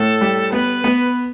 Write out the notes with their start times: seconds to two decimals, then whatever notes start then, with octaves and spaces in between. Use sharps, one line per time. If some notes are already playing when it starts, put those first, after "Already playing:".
Already playing: A2 A4
0.21 G3
0.53 B3 B4
0.84 B3